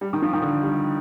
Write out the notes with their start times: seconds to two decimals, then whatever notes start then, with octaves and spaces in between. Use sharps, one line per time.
0.01 G3
0.13 D#3
0.22 F3
0.33 D#3
0.42 D3
0.63 G3